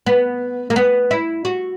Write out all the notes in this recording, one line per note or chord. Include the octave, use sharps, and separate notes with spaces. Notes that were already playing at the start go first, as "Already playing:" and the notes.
B3
A#3
B3
E4
F#4